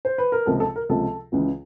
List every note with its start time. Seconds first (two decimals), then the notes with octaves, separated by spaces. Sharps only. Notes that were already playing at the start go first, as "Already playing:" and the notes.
0.05 C5
0.18 B4
0.32 A#4
0.46 C#2 C3 F3 A4
0.60 A4
0.76 A#4
0.89 C#2 C3 F3 A4
1.32 C#2 C#3 E3